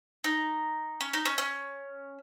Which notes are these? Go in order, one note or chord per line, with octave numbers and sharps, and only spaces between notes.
D#4
C#4
D#4
C#4
C#4